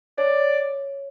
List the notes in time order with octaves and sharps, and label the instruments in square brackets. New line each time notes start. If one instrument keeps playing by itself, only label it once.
[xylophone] C#5 [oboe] D5